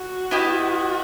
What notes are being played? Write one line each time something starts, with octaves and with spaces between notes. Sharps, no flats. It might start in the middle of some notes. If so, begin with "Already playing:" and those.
Already playing: F#4
B3 E4 G4 D#5